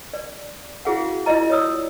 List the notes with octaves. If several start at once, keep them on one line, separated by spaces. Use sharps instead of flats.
D5
E4 F#4 G#4 F5 F#5
E4 F4 D5 D#5 A#5
C#5 D5 D#6 E6